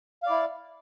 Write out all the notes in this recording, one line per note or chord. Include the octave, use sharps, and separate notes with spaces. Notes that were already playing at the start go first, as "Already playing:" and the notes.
E4 D5 F5